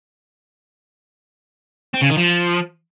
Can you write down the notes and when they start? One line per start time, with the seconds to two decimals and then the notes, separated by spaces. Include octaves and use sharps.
1.94 C4
2.02 C#3
2.10 D#3
2.18 F3